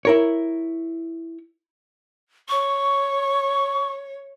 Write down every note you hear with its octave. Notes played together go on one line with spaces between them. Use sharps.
E4 A#4 C#5
C#5 C#6